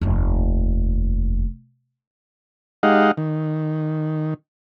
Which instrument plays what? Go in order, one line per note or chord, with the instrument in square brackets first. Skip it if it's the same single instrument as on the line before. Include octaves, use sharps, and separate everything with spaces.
[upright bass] F1 D#2
[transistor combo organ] G#3 D#4 G4 D#5 F5 F#5
D#3